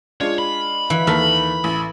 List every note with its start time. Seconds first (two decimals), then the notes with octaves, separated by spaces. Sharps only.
0.21 G#3 D4 F4 C#5
0.39 B5
0.90 E3
1.07 D#2 A4 A#4 B6
1.64 A1